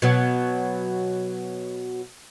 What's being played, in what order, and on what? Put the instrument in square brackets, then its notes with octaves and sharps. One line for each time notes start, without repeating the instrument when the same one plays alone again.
[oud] B2 F#3